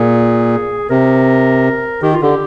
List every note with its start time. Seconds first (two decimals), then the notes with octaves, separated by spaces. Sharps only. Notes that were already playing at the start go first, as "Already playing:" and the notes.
Already playing: A#2 G#4
0.90 C3 A#4
2.02 D#3 G4
2.13 F4
2.22 D3 G4